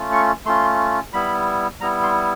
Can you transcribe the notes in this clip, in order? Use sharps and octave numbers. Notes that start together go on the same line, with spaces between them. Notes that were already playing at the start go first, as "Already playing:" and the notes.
Already playing: A3 C#4 F4
C#6
A3 C#4 F4 C6
G3 B3 E4 B5
G3 B3 E4 A#5
C6